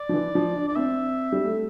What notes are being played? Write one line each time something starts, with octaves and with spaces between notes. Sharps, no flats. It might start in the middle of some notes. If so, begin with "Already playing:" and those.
Already playing: D5
F3
E3
F3
D4
D5
D4
C4 E5
G3
A3